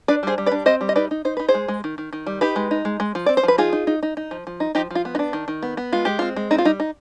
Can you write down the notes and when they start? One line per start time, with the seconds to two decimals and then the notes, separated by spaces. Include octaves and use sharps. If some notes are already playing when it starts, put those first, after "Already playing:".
0.08 D4 B4 D5
0.23 G3 G#4 C5
0.38 G3
0.46 B4 D5
0.52 D4
0.66 C4 C5 D#5
0.81 G3
0.89 D#5
0.96 D#4 B4 D5
1.11 D#4
1.25 D#4 C5
1.37 D#4 B4
1.49 G#4 C5
1.54 G#3
1.68 G#3
1.84 D#3
1.98 D#3
2.13 D#3
2.27 G3
2.41 D#4 G4 B4
2.56 G#3
2.71 D#4
2.85 G#3
3.00 G#3
3.15 F3
3.26 C4 D5
3.37 C5
3.43 F3 B4
3.58 D#4 F4 G#4
3.73 D#4
3.87 D#4
4.03 D#4
4.17 D#4
4.31 F3
4.47 F3
4.60 D#4
4.75 F3 D#4 G4
4.91 F3 F4
5.05 B3
5.15 D#4
5.19 D4
5.33 D#3
5.48 D#3
5.63 B3
5.77 B3
5.93 G#3 F4
6.05 G#3 G4
6.19 C4 F4
6.36 G#3
6.51 C4 D#4
6.58 F4
6.65 G3 D#4
6.80 D#4